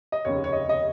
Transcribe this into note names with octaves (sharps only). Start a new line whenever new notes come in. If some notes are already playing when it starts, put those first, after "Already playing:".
D#5
F1 D#2 C#3 C#5
C#5
D#5
D#5